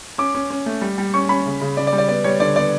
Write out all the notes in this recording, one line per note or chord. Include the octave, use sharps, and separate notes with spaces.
C#4 D6
C#4
C#4
A3
G3
G3
C#4 C#6
C#4 B5
C#3
C#3
C#3 D5
D5
G3
D5
B3 D5
G3 C#5
D3 D5
B3 D5